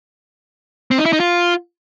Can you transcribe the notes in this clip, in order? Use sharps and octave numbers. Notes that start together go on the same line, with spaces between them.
C4
D#4
E4
D#4
F4